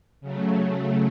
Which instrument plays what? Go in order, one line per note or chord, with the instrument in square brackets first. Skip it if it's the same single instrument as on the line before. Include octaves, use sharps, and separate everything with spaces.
[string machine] C#3 F#3 A3